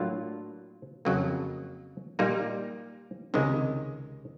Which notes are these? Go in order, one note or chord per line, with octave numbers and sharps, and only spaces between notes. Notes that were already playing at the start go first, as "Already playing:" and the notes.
Already playing: A2 F#3 A#3 D4 F4
F2 C#3 F#3 A#3
A#2 G3 A#3 D#4
C#2 C3 D#3 G#3